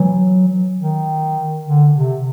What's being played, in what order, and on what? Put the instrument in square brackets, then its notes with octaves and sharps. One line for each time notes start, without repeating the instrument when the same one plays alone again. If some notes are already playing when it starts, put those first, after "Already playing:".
Already playing: [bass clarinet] E3 [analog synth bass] F#3
[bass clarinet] D#3
D3
C3